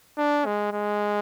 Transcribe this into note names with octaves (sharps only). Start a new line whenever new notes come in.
D4
G#3
G#3